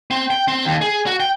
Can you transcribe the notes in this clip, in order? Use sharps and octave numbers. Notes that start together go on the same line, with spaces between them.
C4
G5
C4
D#2
G#4
F#4
G5